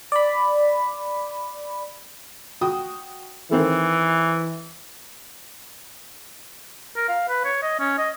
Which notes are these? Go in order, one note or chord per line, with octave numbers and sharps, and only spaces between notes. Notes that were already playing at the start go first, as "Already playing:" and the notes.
D5 B5
F#4 G5 D#6
D#3 E3 C4 A4
A#4
F5
B4
C#5
D#5
C#4
D#5